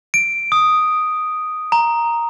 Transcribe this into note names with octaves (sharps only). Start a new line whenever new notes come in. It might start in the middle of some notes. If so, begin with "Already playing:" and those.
D7
D#6
A#5